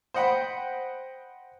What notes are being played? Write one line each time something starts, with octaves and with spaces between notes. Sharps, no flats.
C5 D#5 F#5 G5 B5